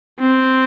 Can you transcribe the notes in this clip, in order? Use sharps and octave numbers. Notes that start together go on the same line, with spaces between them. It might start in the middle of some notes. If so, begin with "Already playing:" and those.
C4